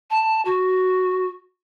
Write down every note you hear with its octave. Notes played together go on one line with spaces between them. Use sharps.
A5
F#4